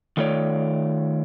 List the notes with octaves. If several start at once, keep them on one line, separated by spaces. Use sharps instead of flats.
D#3 A3 F4 A#4 C#5 D5